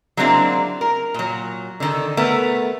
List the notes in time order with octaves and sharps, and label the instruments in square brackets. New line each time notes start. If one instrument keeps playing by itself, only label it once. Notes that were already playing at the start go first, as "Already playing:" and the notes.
[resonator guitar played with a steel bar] F#3 G#3 A#3 C4 D4 E4
A#4
A#2 F#3
D3 D#3 A4
A3 B3 A#4